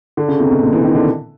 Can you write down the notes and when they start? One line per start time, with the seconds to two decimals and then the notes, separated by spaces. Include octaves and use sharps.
0.17 D3
0.28 C#3
0.40 C3
0.51 B2
0.62 A#2
0.73 E3
0.84 D#3
0.95 D3